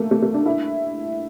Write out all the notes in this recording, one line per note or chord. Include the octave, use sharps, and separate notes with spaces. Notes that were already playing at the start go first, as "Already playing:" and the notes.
Already playing: A3 A#3
A3
A3
D4
E4